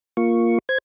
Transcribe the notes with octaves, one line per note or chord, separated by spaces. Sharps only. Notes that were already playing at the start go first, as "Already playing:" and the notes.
A#3 F4 C#6
C5 G#6